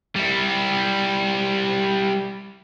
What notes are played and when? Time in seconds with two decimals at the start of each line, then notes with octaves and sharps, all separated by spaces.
0.16 G3 E4